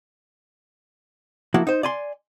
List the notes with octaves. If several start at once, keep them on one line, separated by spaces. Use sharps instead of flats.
F3 A#3 E4 F#4
D#4 C5
D5 G#5 C6